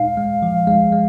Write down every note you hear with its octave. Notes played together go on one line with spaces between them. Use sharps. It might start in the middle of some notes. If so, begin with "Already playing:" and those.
Already playing: A#2 G#3 D#4 F5
G#3
F3
G#3
G#3